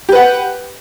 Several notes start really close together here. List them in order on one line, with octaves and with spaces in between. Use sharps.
G4 B4 F#5